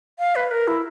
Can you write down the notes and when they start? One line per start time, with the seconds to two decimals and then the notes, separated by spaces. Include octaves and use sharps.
0.19 F5
0.36 B4
0.51 A#4
0.68 E4